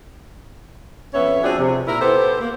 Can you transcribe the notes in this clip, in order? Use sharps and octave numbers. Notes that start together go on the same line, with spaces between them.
F2 B3 C#4 C#5 E5
F3 C4 D4 F#4 G#4
C3
A#2 E4 A#4
B3 G4 A4 C5
A#3